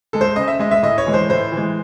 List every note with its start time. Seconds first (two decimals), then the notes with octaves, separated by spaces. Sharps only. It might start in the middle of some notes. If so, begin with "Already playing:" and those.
0.13 G#3 A4
0.21 C5
0.36 C#3 D#5
0.48 E5
0.59 G#3 D#5
0.71 E5
0.82 A2 D#5
0.98 C#5
1.06 E3 G#3
1.14 C5
1.30 A2 C5
1.52 E3 G#3